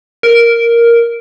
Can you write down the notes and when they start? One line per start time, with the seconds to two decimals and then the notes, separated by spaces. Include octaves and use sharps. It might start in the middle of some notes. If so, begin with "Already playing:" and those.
0.23 A#4